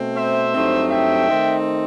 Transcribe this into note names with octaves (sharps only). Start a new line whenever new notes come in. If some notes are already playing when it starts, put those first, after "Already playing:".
Already playing: B2 A3 C4
C5 E5
G2 F#3 A3 C4 D#4
E5 G5
D#3 A3 C4 D#4